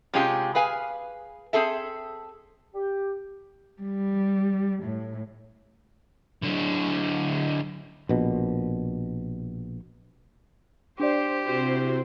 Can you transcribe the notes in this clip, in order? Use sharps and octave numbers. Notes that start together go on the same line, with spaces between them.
C3 G#3 C#4 F4 G4 G#4
G#4 B4 F5 G#5
C4 G#4 A4 E5
G4
G3
A2
D3 F#3
A#1 B2
D4 G4 C5 D5
C3 E4 F#4 C5